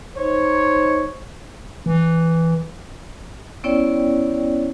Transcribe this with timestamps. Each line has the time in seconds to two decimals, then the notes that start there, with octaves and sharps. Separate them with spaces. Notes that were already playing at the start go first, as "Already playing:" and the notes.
0.17 D#4 C5 C#5
1.86 E3
3.64 B3 C#4 E4 C#5 D5 G5